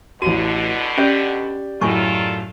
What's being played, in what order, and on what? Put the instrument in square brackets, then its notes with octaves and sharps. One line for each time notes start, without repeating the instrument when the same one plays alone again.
[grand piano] A1 D#7 [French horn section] B2 D3 [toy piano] F#4
[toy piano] C#4 [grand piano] G4 D5 G6
[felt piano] F#2 A2 F#3 [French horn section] D#3 F4 A4 [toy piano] G#5 C#6